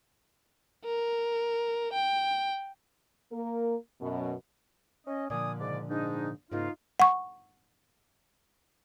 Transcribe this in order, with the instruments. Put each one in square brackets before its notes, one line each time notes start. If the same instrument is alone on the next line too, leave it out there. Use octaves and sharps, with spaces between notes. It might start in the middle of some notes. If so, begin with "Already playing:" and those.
[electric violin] A#4
G5
[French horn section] A#3 A#4
F#2 B2
[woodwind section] C#4 D#5
[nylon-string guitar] A#2 D3 F3 [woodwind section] D5 G#5 D#6
[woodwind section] G#2 C#3 D5
G#2 D4 D#4
[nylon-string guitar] G#2 C#3 A#3 [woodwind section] D#4 F4
[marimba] F#5 C#6